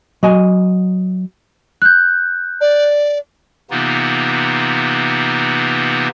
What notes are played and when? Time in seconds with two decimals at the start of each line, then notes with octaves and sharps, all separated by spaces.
0.23 F#3 D#5 G#5
1.82 F#6 G6
2.61 D5
3.71 C3 E3 A#3 B3 D#4 F4